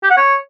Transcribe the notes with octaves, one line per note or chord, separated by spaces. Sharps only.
G4
F#5
C#5